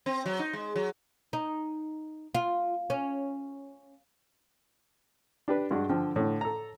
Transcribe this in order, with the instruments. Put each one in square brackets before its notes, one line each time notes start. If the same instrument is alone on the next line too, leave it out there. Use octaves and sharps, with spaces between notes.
[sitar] C4
F#3
D#4
G#3
F#3
[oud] D#4
F4
C#4
[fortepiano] D4 G4 B4
G2 G#3 D4 F#4 F#5
D3 F3 G5
A2 D3
A4 A#5